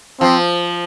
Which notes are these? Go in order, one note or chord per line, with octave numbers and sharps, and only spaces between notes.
F3 C4